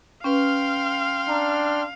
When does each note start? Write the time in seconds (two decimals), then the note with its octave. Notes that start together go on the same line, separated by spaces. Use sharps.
0.24 C#4 B4 F5 G5 C6 F6
1.29 D4 A#5